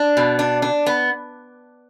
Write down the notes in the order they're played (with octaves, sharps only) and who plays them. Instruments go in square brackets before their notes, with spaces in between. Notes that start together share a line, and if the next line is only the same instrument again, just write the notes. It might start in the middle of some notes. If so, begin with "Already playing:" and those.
Already playing: [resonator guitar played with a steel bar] D4
B2
D4
D4
B3